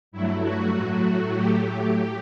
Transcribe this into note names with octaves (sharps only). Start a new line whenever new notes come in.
G2 F#3 A3 E4
F#4
A2 F#3 A3
A2 F#3 A3 G4